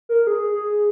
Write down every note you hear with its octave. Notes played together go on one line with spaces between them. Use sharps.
A#4
G#4
G#4